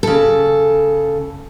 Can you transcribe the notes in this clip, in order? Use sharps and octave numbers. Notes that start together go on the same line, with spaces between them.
C#3 A4